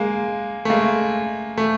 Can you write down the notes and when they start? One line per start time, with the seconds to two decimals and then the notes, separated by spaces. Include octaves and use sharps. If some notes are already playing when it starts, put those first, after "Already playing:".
Already playing: G#3 A#3
0.65 A3
0.70 G#3 A#3
1.57 A3